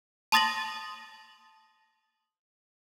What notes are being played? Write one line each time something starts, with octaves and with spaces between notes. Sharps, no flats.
A5 C6 D#6 A6 A#6 F#7